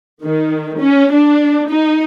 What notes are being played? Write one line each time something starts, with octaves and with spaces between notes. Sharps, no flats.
D#3
C#4
D4
D#4